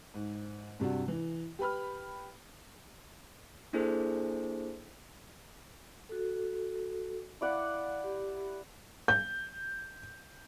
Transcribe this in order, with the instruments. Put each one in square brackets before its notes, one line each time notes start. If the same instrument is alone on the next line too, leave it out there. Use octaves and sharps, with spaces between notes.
[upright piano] G#2
G2 C3 D4 F#4
E3
G4 B4 B5 F6
[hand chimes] A#3 D4 E4 G#4 A4 C5
[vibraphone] F#4 A4
[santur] E4 D5 F#5 [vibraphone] F5
[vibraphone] G4
[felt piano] G6